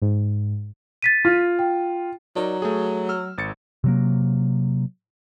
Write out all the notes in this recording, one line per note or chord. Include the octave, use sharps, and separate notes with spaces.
G#2
A6 B6 D#7
F4
G5
F#3 D#4 A#4 D5
A3 G#4
E6 F6
G#1 A6 C#7
C3 F#3 A#3